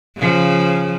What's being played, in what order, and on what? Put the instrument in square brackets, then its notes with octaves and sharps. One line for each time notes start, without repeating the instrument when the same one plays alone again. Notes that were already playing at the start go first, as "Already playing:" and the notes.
[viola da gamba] C#3 F3